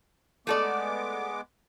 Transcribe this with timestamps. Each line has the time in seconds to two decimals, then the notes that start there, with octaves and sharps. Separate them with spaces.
0.47 G#3 A3 B3 A4 D5 D6